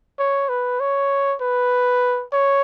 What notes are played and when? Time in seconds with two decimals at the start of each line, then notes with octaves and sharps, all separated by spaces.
0.19 C#5
0.49 B4
0.80 C#5
1.41 B4
2.33 C#5